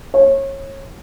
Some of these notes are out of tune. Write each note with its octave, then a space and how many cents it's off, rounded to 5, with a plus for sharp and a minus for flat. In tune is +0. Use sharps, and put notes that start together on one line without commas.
C#5 -30